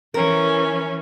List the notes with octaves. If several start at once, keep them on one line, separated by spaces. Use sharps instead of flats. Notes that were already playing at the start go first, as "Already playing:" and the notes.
E3 C#4 A#4